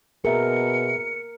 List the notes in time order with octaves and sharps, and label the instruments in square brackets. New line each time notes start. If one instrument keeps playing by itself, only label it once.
[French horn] B2 [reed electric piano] G#4 E5 [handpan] A#4 [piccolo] C#7